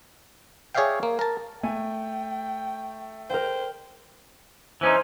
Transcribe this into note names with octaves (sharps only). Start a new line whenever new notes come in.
G#4 C#5 D5 E5 F5 G5
A#3
A#4 A5
A3 G5 G#5
A#4 C5 G5
E3 C#4 D#4 C5